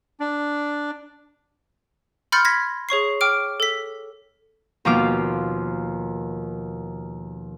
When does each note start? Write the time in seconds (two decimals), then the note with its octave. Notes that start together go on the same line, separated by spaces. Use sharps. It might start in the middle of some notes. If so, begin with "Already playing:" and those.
0.20 D4
2.32 B5 C6 F6 G6 A6 C#7
2.45 G#6 A#6 B6
2.89 G#4 C#5 C#6 C7
3.21 G5 D6 F6 D7
3.60 A4 B6
4.85 D#2 B2 F3 F4 D6 F6